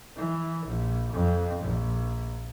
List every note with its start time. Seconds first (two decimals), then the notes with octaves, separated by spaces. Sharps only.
0.16 E3
0.66 A#1
1.13 F2
1.62 A#1